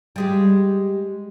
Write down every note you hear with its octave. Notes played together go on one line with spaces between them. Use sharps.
G3 G#3 G4